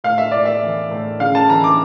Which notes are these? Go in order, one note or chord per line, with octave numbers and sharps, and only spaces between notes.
A2 F5
E5
A2 D5
E5
E3
A2
C#3 F5
A5
E3 A#5
D6